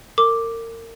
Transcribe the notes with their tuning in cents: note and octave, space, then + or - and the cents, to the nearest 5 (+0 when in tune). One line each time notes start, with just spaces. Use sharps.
A#4 -35 D6 +0